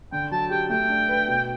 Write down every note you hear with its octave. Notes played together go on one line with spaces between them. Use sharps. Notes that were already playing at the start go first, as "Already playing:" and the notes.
D3 G5
F#3 A5
G4 G5
A3 G5
D4
B4
B2